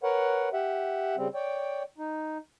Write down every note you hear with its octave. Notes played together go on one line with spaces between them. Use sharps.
A#4 B4 C#5 F#5
G4 E5 F#5
C#3 G3 C4
C#5 D5 G5
D#4